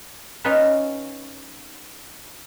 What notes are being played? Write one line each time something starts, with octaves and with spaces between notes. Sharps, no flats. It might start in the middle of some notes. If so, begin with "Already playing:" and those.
C#4 D#4 F4 B4